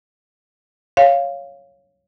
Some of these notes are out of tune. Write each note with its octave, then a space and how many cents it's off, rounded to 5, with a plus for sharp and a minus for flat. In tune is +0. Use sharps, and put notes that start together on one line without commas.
C#5 +0 F5 +0